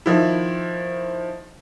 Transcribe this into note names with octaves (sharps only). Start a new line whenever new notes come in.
D#3 F3 E4